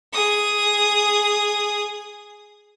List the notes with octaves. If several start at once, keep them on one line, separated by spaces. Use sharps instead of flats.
G#4 D#6